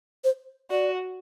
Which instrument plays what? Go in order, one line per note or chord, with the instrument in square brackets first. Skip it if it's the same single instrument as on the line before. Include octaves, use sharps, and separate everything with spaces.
[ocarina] C5
[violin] F#4 [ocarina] D5